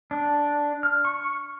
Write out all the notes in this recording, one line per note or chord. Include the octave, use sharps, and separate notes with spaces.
D4
F6
C#6